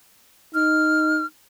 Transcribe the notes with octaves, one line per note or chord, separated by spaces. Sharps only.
D#4 F6